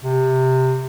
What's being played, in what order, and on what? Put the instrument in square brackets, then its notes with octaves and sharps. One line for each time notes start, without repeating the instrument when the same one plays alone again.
[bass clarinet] C3